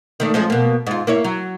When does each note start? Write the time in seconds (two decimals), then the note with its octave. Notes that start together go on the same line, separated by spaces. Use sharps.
0.20 D#3 A3 D4
0.34 F3 G#3 C#4
0.50 B2 A#3
0.87 G#2 F4
1.07 A#3 E4 C#5
1.24 F#3